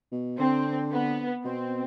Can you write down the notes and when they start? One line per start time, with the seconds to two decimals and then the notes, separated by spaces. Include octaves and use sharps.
0.12 B2
0.39 D3 C4
0.91 B3
1.44 B2 C4